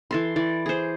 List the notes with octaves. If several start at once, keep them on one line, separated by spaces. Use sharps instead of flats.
E3 A4 C6
E3 D5
G#4 C5